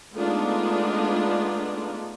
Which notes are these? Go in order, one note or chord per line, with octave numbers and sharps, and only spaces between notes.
G#3 A3 B3 D4 D#4 F4